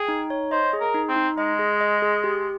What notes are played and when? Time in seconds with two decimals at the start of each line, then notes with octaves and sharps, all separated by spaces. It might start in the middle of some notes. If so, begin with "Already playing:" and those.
Already playing: G#4 G5
0.08 D#4
0.30 C#5
0.51 C5 D#5
0.73 G#4
0.81 A#4
0.94 D#4
1.09 C4
1.16 D#4
1.38 G#3 D#5
1.59 G#4
1.81 D#5
2.02 G#4
2.24 G4